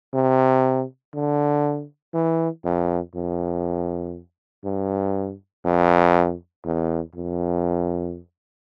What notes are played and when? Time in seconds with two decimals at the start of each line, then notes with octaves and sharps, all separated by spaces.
0.14 C3
1.15 D3
2.14 E3
2.64 F2
3.15 F2
4.64 G2
5.65 F2
6.65 E2
7.15 F2